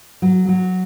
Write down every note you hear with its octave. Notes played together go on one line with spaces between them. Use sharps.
F#3
F#3